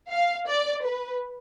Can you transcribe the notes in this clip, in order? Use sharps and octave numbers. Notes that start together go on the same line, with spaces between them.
F5
D5
B4